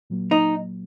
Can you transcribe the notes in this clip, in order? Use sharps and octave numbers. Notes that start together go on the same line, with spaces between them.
A#2 F#3 A#3
D#4